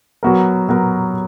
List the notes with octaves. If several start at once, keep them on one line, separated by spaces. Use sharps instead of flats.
F#3 B3 F#4 A#4
F#3 B3 F#4 A#4